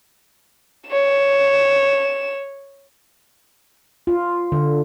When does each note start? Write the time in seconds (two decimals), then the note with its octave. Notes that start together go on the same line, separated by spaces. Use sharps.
0.89 C#5 E7
4.07 F4
4.52 D3